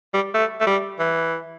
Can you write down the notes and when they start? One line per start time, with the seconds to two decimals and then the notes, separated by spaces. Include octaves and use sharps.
0.14 G3
0.34 A3
0.61 A3
0.67 G3
0.99 E3